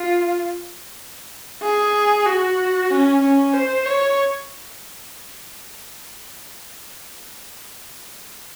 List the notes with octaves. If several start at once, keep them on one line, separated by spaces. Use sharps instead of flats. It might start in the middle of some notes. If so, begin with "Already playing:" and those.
Already playing: F4
G#4
F#4
C#4
C#4
C5
C#5